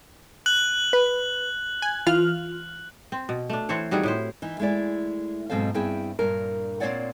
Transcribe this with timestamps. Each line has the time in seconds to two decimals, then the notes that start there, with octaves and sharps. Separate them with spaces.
0.46 F#6 F#7
0.93 B4
1.82 G#5
2.07 E3 F4 F6
3.12 C4
3.29 B2
3.50 A3 D4
3.69 E3 C4 C5 C#5
3.91 D#3 G3 F#4 G#4
4.03 A2 E4 C5
4.42 E3 D#4
4.59 G#3 A3 E4 D5
5.50 G#2 B2 F#3 C4 A4 F5
5.74 G2 C4 E4 G#4 G5
6.19 G2 A#2 A#4
6.80 A#2 B3 C4 C#5 D5 F#5